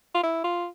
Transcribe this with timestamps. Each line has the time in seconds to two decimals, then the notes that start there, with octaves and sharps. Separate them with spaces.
0.14 F4
0.23 E4
0.44 F4